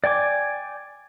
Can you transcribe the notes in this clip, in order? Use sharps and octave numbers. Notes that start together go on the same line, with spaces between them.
D5 G5 G#5 D6